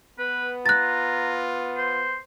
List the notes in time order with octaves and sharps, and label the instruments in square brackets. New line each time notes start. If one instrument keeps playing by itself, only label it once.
[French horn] B3 [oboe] B4
[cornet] F4 [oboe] A#5 [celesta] F#6 A6
[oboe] C5